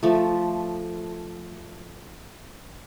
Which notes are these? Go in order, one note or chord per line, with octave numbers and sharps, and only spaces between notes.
F3 A3